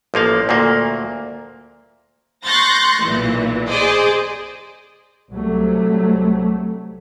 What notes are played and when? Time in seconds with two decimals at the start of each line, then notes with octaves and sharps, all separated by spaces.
0.14 A1 F3 A#3 F5
0.49 D2 A#2 A#3
2.46 C6 C#6 F#6 G6 A6 A#6
3.02 B1 A#2 E3
3.69 G#4 C5 D5 D#5
5.33 C2 C3 F#3 A3